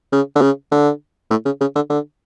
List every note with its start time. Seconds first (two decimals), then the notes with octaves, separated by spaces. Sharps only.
0.12 C#3
0.35 D3
0.42 C#3
0.72 D3
1.31 A2
1.45 C#3
1.61 C#3
1.75 D3
1.90 D3